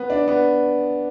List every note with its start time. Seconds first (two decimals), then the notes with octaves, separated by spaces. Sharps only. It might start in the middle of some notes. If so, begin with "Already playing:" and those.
Already playing: B3
0.10 D4
0.28 B3